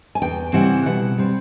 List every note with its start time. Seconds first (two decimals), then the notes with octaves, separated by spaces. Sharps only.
0.15 G#5
0.22 E2 G5
0.53 C#3 E3 G3 C4 F#5
0.86 B2 F#5
1.18 G3 C4